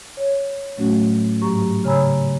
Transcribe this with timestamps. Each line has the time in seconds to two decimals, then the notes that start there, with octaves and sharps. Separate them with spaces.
0.17 C#5
0.77 A2 F#3 A3 C#4 F#4
1.42 G#2 F#3 G4 A#5 C#6
1.84 C#3 C#5 G#5 A#5 B5 E6